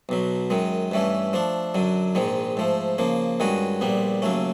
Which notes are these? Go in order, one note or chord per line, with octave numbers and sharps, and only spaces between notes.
B1 B2 F#3
F#2 D#3 G#3
G2 E3 A3 C#4
F3 A3 D4
F#2 D3 F#3
A#1 G#2 D#3 G#3
G#2 F3 A3
C#3 F3 A#3
G2 D#3 G#3 C#4 F#4
A#1 A#2 G3 B3
D#2 C#3 F#3 A3 C#4